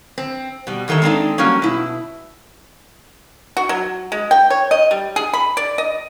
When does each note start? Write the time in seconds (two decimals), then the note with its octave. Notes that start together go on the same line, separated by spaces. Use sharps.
0.18 C4
0.67 B2 G3
0.88 F2 D#3 A4 C#5 E5
1.02 G#3 B3 C4 D4 D#4 A4
1.38 F#3 G3 A#3 C#4
1.62 B2 E4
3.57 F#4
3.69 F#3
4.12 G#3
4.31 G5
4.50 C#5
4.71 D#5
4.91 G3
5.16 G#4
5.34 B5
5.57 D5
5.78 D#5